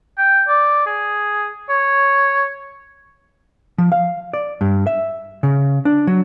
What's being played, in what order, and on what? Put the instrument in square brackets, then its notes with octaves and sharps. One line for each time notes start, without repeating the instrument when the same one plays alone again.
[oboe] G5
D5
G#4
C#5
[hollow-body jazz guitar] F3
F5
D5
G2
E5
C#3
D4
F#3